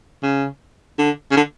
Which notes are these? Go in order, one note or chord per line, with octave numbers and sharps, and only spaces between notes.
C#3
D3
C#3
D3